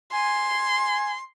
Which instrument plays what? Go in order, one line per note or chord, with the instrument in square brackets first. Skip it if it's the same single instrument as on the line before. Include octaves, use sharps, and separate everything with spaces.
[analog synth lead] G#5 [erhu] C6